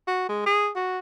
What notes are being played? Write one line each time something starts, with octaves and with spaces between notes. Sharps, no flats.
F#4
G#3
G#4
F#4